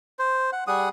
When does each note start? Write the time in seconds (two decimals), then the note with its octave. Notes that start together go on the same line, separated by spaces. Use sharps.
0.19 C5
0.53 F#5
0.67 G3 G#4 F#5 D#6